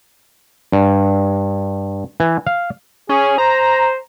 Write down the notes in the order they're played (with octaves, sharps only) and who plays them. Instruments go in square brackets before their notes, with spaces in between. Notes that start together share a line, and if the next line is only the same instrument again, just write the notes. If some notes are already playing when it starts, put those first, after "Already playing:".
[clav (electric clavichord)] G2
E3
F5
[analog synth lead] C#4 [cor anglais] G#4
[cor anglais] C5 [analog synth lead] A#5